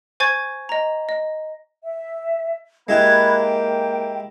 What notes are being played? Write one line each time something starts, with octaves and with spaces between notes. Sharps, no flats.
C5 G#5 C#6 G#6 A6
D#5 A#5
D#5
E5
G#3 A#3 E4 G4 B5 F#6 G#6
G5